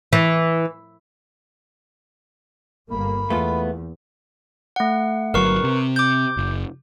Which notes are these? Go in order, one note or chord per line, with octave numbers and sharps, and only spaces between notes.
E3
G1 A#3 B5
E2 A3 B3 F4
A3 F#5
G1 F#3 A#4 B4 C#6
C3
D6 G6
F#1